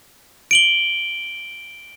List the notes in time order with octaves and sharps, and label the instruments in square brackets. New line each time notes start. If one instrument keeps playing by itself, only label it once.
[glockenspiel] D7 F#7 G7